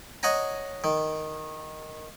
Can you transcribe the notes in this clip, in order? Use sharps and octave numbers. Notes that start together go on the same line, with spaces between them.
C#5 D#5 F#5 G#5 A#5
D#3